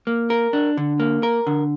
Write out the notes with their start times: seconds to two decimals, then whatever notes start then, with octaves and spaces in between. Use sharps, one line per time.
0.07 A#3
0.30 A#4
0.53 D4
0.77 D3
1.00 A#3
1.23 A#4
1.47 D3